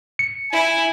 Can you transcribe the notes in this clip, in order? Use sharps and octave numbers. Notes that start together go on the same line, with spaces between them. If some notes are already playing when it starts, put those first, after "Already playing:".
C#7
E4 G#5